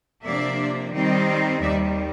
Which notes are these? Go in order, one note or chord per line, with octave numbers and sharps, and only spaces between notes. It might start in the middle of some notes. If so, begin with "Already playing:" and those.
C3 F3 A#3 D4 D5 E5
D#3 G3 C4 D#4
D#2 D#3 G3 D5 E5